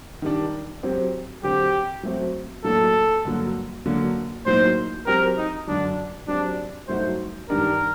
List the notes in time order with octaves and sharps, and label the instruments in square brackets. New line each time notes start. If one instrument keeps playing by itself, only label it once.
[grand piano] D#3 G3 D4
F#3 C4 G4
[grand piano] D3 F#3 C4 [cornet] G4
[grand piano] F#3 A3 C4 F#4
[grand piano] A2 F#3 A#3 D4 [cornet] A4
[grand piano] G2 D3 F#3 A#3
D3 F#3 A#3
[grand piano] A2 F#3 A#3 D#4 [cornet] C5
[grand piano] F#3 C4 G4 [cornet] A#4
[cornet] D#4
[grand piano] F#2 D3 F#3 [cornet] D4
[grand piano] F#3 C4 G4 [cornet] D4
[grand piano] G2 F#3 A3 D#4 F#4 [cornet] C5
[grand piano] G2 D#3 G3 D4 [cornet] A#4